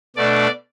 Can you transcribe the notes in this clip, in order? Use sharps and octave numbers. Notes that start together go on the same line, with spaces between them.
B2 A3 D4 D5